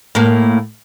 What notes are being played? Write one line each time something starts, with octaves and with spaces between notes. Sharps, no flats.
A2 A#3